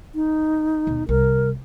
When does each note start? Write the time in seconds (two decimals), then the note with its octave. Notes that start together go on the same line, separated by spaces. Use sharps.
0.15 D#4
0.87 D#2 B2
1.09 C2 A#4